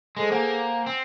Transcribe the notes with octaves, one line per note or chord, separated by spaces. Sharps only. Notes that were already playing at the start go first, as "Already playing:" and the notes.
G#3 G#4 A4 C5
A#3 C5 F#5 G#5
C4